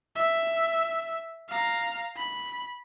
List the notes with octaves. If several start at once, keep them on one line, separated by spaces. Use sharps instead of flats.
E5
F5 A#5
B5